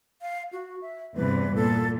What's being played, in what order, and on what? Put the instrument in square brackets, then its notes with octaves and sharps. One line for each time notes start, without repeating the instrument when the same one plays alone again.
[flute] F5
F#4
E5
[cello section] E2 G2 C3 [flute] B4
[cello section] A#2 [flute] A4